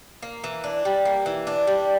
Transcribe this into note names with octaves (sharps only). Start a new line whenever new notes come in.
A#3
E3
D4
G3
A#3
E3
D4
G3